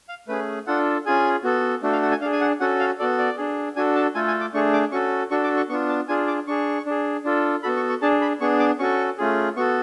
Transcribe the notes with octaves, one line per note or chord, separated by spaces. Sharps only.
F5
A3 C#4 G#4 B4
D4 F4 A4 F#5
C#4 F4 G#4 G#5
B3 F#4 A4
A3 D4 F#4 A4
F5
F#5
G#5
D4 G#4 F5
G#5
F#5
C#4 F#4 A4 F#5
F5
B3 F#4 A4 D5
D5
D4 G#4
D4 F#4 A4 G#5
A5
A3 F4 A4 G#5
G#5
D6
A3 D4 G#4 C#6
D6
C#4 F#4 A4 C#6
D4 F#4 A4 C#6
D6
C#6
B3 D4 F4 C#6
A5
D4 F4 G#4 G#5
D6
D4 G#4 C#6
D4 G#4
D4 F4 A4
B3 F#4 A4 B5
C#6
C#6
D4 G#4 A5
B5
B3 D4 G#4 C#6
D6
C#4 F#4 A4 C#6
A3 C#4 F4 G#4
B3 F#4 A4 C#6